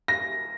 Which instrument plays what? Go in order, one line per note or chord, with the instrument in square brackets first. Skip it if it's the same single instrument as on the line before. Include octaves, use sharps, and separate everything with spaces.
[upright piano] A#6